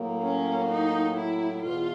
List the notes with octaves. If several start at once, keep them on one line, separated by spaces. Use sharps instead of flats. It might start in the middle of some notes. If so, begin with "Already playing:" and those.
Already playing: A2 F#3 A#3
C#4
D#4
E4
E2 B2 F4